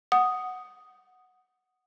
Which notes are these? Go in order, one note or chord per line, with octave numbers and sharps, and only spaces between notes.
F#5 D#6